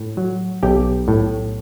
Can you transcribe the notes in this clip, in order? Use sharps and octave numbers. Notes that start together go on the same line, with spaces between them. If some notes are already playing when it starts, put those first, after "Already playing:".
Already playing: A2
F#3
B1 G4 G5
A2